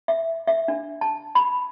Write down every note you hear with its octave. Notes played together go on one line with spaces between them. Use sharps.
E5
E5
D4
A5
B5